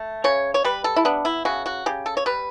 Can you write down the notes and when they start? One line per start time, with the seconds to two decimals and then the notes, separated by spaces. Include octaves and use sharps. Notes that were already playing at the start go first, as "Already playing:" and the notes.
Already playing: A3
0.24 C#3 C#5
0.54 C#5
0.64 G3 B4
0.84 A4
0.96 E4
1.05 B3 D4
1.25 E4
1.45 C#3 F#4
1.66 F#4
1.86 C#3 G4
2.06 A4
2.17 C#5
2.26 G3 B4